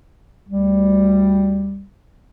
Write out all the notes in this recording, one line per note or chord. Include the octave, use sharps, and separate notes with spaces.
D2 G3